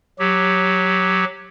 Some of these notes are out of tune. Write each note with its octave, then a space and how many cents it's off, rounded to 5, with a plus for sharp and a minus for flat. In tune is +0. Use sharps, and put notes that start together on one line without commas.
F#3 +0 G4 +0